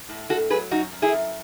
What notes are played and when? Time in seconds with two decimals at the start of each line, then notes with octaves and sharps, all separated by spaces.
0.09 A2
0.29 A2 F#4 A4
0.50 F#3 G#4 B4
0.71 F#2 D#4 F#4
0.92 F#2
1.02 E4 G#4
1.13 F#2